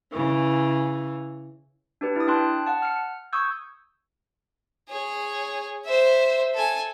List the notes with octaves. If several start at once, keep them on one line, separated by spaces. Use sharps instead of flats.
C#3 E3
D4 G4 B4
E4 D#6
D4 G5 A5 C6 F#6
F#5 A5
F6 C#7
C#6 D#6 E6 G6 G#6
G#4 C#5
C5 E5
A4 G#5